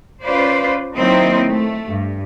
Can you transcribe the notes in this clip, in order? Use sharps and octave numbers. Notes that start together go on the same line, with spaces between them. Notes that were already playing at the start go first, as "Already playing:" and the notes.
C#4 F4 B4 C5 D5
D#3 F#3 A#3 C4 D#4 E4
A3
G2